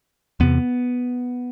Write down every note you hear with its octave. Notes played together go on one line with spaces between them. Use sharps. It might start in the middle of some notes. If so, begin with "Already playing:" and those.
E2 C3 B3